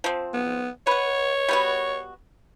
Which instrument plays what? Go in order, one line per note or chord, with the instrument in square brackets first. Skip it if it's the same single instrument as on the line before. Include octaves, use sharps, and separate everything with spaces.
[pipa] F3 C4
[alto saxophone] B3
[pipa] B4 F#5 [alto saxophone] C#5
[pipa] G3 B3 F#4